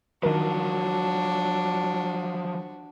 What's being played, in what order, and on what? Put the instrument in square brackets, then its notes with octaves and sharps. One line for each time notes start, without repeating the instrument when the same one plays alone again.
[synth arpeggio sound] D#3 A#4 [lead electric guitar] F3 F#3 [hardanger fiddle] D4 F#4